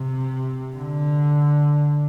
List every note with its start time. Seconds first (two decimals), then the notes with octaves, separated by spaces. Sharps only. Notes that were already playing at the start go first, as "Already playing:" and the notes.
Already playing: C3
0.76 D3